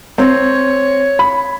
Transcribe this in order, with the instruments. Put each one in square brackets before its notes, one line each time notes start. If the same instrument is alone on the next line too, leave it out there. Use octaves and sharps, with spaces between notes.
[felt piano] C4 [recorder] C#5
[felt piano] B5